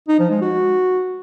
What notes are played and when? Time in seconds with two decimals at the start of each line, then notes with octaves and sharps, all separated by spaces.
0.08 D#4
0.19 F3
0.30 G#3
0.42 F#4